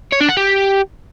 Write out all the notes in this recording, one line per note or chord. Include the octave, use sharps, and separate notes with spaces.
C#5
D4
F#5
G4